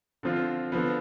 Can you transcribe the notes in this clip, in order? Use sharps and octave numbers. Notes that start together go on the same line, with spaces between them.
D3 F3 C4 F4
D3 F3 B3